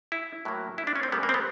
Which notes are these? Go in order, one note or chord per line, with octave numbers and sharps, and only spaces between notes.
E4
A2 F#3 A#3
E4
D4
C#4
C4
C#3 E3 G3 A#3 B3
A#3
C4
B3